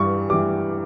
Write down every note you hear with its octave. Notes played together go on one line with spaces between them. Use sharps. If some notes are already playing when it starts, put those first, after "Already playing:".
Already playing: G2 E3 G3 C#6
E3 G3 D6